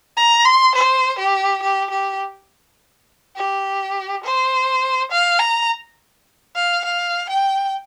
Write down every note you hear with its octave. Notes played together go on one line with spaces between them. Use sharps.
A#5
C6
C5
G4
G4
G4
G4
C5
F5
A#5
F5
F5
G5